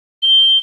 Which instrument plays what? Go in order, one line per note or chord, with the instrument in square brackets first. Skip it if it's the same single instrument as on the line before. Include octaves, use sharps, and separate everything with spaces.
[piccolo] G7